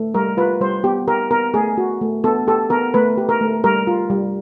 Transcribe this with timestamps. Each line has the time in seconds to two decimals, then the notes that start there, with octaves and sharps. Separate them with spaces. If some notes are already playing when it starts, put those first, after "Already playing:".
Already playing: A3
0.15 G3 A#4
0.37 F4 B4
0.61 G3 C5
0.84 B3 G4
1.07 G4 A#4
1.31 B3 A#4
1.54 A3 G#4
1.78 F#4
2.01 A3
2.24 B3 A4
2.47 G4 A4
2.70 B3 A#4
2.94 A3 B4
3.17 G4
3.29 A#4
3.41 A3
3.64 G3 A#4
3.87 F4
4.10 G3